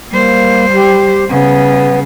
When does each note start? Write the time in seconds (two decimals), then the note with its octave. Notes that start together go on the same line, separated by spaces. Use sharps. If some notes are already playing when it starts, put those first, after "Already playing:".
0.11 G3 A#3 C5
0.75 G4
1.28 C#3 G3 B3